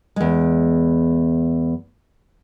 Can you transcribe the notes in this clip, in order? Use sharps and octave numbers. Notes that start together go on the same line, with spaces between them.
E2 G#3